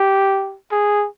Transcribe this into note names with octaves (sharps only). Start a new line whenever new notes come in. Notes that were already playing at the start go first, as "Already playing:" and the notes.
Already playing: G4
G#4